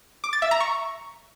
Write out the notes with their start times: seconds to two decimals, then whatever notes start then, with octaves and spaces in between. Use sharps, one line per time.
0.24 D6
0.33 A6
0.42 E5
0.51 A#5
0.60 C#6